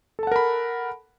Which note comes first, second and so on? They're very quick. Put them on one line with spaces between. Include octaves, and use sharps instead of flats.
A4 A5 F#5 A#4 B5